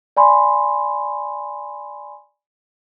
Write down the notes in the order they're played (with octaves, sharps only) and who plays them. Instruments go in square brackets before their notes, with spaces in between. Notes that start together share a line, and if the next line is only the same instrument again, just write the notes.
[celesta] D5 G#5 B5 C6